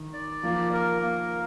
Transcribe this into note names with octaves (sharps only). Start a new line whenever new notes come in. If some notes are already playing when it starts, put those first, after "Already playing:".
Already playing: D#3
D5
F3 A#3
A#4
A#3